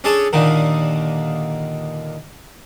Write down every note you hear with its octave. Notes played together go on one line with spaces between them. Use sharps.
C#4 D4 G#4 A4 C#5 A5
D#2 A#2 D3 D#3 D#4